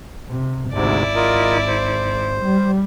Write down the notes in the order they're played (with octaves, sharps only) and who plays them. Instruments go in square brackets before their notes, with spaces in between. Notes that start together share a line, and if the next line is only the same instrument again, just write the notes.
[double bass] C3
[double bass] G#1 [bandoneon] D2 G#2 C3 [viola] E4 D5
[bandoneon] F4 A#4 D#5
C5
[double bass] G3